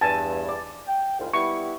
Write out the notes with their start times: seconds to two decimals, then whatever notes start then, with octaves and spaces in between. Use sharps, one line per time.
0.01 E2 G2 G#5 A5
0.49 D5
0.87 G5
1.19 C2 G#2 F4
1.33 G3 B3 E4 C#6